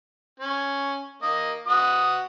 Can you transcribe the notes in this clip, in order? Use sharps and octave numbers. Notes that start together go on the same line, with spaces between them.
C#4
A#3 D#5
F#4 D#6